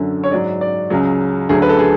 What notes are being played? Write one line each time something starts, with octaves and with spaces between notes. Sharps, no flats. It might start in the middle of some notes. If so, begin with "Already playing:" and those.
Already playing: F#2 D3 F#3
C#5
G#2 F#3 D5
D5
C#2 C#3 F#3
D2 D3 F#3 G#4
B4
A4
G#4